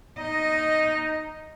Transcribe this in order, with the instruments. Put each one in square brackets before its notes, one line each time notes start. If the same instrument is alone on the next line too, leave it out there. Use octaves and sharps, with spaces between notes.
[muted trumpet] D#4 [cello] D#5